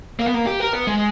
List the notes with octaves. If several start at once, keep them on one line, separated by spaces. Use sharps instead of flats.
A#3
B3
A#3
G4
A#4
B3
G#3